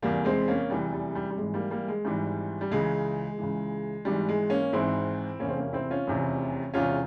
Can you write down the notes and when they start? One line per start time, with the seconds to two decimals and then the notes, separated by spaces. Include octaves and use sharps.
0.02 F1 E2 E3 G3 A#3
0.25 G#3 C4
0.48 A#3 C#4
0.70 F1 E2 E3 G3
0.93 G3
1.15 G3
1.31 G3
1.37 G#1 G#2 E3 G#3
1.54 G3 A#3
1.70 G3 A#3
1.88 G#3
2.05 G#1 G#2 E3 G3
2.61 G3
2.71 C#2 C#3 E3 G#3
3.38 C#2 C#3 E3
4.05 G#1 G#2 E3 G3
4.29 G#3
4.50 A#3 C#4
4.73 G#1 G#2 E3 C4 E4
5.39 F1 E2 C3 E3 A#3 C#4
5.49 C4
5.56 A#3 C#4
5.73 C4 E4
5.90 C#4 F4
6.07 F1 E2 C3 E3
6.74 E1 E2 C3 E3 C#4 F4